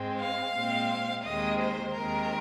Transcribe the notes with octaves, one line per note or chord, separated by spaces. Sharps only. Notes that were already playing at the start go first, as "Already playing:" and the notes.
Already playing: G#2 G#3 C4
F5
A#2 G#3 C4
D#2 D#3 G#3 C4 D#5
C5
D#2 D#3 G#3 C4 A#4